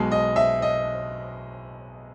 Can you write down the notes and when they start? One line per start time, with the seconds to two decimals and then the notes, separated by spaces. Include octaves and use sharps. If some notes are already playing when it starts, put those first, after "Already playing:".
Already playing: B1 B2 G#3
0.11 D#5
0.36 E5
0.62 D#5